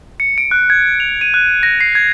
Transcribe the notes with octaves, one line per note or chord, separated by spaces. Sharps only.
C#7
D7
F#6
G#6
F7
D#7
F#6
A#6
C7
G#6